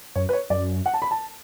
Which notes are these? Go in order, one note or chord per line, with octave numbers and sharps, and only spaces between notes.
F#2 C#5
B4
C#5
F#2 D5
F#5
A5
B5
A5